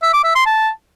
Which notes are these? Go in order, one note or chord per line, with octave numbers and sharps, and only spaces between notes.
E5
D6
E5
C6
A5